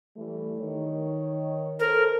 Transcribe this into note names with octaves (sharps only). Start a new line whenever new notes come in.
E3 G3 A3
D#3 C#5
A4 A#4 C5